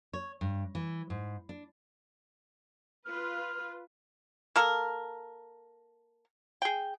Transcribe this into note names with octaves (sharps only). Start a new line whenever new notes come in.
C#5
G2
E3
G#2
D4
F4 B4 F6
A#3 A4 A#4
G#4 G5